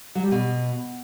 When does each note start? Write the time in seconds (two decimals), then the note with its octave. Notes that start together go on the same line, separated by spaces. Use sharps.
0.15 F#3
0.23 G3
0.31 B2